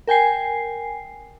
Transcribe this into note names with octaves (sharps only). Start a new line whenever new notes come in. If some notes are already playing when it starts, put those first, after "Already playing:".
A#4 G5 G#5 C7